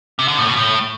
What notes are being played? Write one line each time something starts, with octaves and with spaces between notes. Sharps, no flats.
C3
D3
A2
B2
A2